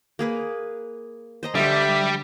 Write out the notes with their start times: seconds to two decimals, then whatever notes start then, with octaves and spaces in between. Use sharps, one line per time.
0.19 A#3 G#4 B4
1.43 C5 D#5 A#5
1.55 D3 G3 G4 E5